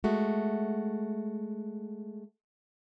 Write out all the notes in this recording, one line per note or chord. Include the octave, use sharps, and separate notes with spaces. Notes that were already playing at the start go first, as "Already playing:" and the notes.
G#3 A3 F#4